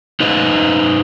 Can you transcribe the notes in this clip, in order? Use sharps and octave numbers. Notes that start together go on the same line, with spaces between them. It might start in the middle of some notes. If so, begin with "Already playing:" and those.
D#4 B4 C5 D#5